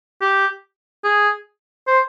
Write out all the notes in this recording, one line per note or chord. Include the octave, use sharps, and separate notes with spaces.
G4
G#4
C5